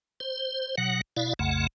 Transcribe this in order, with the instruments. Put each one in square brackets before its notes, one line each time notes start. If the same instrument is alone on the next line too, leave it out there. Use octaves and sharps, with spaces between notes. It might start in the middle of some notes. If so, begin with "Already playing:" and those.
[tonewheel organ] C5
B2 F#3 F#5
B2 E4 D5 F5
B1 F2 C#3 A3 F#5